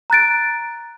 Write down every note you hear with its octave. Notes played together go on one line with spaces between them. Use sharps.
A#5 F#6 A6 D7